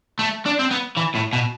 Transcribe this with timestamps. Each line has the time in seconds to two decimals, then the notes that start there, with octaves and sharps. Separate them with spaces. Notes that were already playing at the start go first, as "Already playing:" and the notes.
0.19 A3
0.46 D4
0.59 C4
0.71 B3
0.97 E3
1.15 A2
1.33 B2